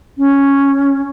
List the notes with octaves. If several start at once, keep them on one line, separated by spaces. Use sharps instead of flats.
C#4